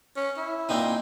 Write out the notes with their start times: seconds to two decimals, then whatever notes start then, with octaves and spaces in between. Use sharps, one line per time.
0.16 C#4
0.37 E4
0.69 A#2 C4 D#4